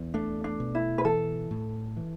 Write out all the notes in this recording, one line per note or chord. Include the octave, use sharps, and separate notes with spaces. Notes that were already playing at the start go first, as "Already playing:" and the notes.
Already playing: E2
A3 D4
D4
B2
E4
B4
E3 A4
A2
E3